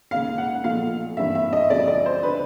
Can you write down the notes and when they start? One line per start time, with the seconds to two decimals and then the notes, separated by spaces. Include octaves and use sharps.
0.11 E1 D#2 C#3 F5
0.38 F#5
0.64 B1 A#2 F3 A3 F5
1.17 G#1 G2 E3 G3 A#3 E5
1.35 E5
1.53 D#5
1.70 E1 D2 C#3 F3 D5
1.80 D#5
1.88 D5
2.06 C5
2.23 D3 B4